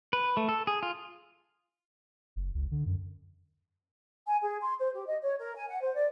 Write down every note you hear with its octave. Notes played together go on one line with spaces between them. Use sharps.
B4
A3
A4
G#4
F4
F#1
C#2
D3
F#2
G#5
G#4
C6
C5
G4
D#5
C#5
A#4
G#5
F#5
C5
D5